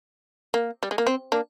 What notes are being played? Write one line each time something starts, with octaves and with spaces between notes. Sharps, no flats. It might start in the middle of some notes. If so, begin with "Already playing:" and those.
A#3
G3
G#3
A#3
C4
A#3 D4